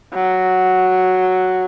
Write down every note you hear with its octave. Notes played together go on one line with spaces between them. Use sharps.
F#3